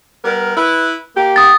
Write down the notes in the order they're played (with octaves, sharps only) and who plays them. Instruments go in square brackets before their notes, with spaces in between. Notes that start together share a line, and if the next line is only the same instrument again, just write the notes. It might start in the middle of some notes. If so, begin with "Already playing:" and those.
[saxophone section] G3 B3 A#4
E4 B4
A#3 G4
[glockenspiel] D#6 A6